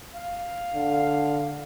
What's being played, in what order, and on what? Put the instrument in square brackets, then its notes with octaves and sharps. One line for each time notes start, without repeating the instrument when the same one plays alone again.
[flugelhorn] F5
[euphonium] D3